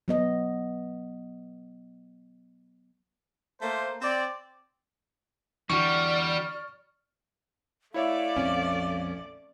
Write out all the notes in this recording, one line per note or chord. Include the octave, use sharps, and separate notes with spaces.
F#3 B3 D#5
A3 A#3 C5
C4 D5
E2 D3 G3 F#4 D5 C#6 F6
A3 E4 C#5 D5 E5 F5
A#1 F2 C4 C#4